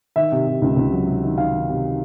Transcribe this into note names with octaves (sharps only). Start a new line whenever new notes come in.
D#3 E5
C3
C3
C#2
C#2
F#3
C3
D#3
D#3 F5
D#3
C3